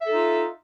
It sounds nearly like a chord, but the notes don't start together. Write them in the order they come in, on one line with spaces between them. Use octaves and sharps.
E5 A4 D#4 F4